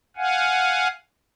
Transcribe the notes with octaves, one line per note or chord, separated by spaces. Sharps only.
F5 F#5 G#5